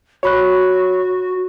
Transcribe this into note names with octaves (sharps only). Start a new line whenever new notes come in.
F#4 C#5 B5 F#6